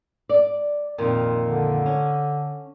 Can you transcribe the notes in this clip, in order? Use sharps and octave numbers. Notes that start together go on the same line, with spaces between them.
D5
F2 A#2 D#3
D3
C#4